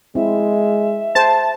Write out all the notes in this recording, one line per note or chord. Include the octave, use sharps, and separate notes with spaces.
G#3 C4 E4 E5
G#4 C5 G5 A5